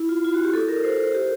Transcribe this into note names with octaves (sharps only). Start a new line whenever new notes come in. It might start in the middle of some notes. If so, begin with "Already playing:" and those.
Already playing: E4
F4
F4
F#4
G4
A4
A#4
C5
G4